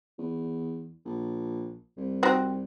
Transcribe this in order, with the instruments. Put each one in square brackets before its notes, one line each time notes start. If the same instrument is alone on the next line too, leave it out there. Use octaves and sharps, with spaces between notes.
[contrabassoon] E2
A#1
C2
[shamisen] C4 D#4 F#4